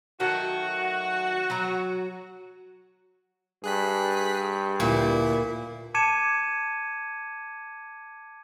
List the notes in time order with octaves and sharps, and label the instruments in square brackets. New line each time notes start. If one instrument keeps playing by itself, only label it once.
[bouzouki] D#3 F#3 A3 [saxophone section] F#4
[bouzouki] F#3 A#5
[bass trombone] G2 [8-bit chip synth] G#4 F#6 B6
[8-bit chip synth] D2 E4 [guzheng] A#2
[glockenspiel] A5 D6 G#6 C#7 D#7 E7